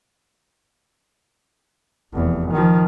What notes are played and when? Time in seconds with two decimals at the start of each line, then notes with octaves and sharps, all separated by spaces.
2.13 F1 E2
2.51 D#3 F3